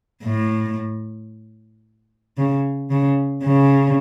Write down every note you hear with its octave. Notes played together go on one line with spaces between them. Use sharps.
A2
C#3
C#3
C#3